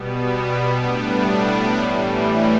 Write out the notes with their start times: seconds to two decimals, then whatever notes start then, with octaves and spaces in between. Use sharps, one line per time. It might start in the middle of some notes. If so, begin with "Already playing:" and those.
Already playing: B2 G3 B3
0.78 A2 G3 B3 D4
1.78 A2 E3 G3